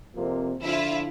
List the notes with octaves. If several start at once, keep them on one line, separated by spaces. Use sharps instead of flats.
F2 C3 A#3
D3 F3 E4 F4